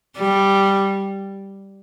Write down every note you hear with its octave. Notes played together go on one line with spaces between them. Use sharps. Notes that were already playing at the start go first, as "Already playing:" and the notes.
G3